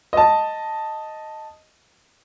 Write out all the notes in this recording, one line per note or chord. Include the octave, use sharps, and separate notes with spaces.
D#5 A5